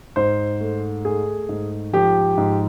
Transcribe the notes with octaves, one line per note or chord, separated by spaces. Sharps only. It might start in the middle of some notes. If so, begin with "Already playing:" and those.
G#2 C5
A3
A3 G#4
G#2
F3 G4
G#2